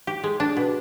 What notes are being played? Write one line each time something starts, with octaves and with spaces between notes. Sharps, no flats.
G4
G#3
D4
B2